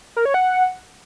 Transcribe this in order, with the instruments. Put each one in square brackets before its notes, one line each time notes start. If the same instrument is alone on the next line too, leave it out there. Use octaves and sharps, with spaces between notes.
[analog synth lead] A#4
C#5
F#5